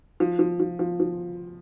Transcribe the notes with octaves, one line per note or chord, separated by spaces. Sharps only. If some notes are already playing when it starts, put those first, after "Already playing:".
F3
F3
F3
F3
F3